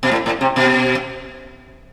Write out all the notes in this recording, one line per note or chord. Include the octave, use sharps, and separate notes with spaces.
B2
A2
A2
C3
B2